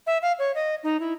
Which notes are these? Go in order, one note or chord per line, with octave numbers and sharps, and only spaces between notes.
E5
F5
C#5
D#5
D#4
E4